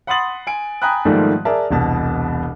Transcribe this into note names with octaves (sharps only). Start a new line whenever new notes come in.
F#5 B5 C6 D#6 A6 F#7
G#5 D7
G5 G#5 A#5 B5 D#6 F#6
G#2 D#3 F3 G3 A3 A#3
G#4 A#4 D5 E5 A5
E1 C2 B2 A5